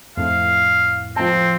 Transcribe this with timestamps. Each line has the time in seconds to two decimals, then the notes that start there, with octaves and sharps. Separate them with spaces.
0.17 F2 A2 F5
1.16 F3 C4 A5